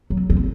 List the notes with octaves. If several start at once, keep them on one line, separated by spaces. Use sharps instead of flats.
F#3
C4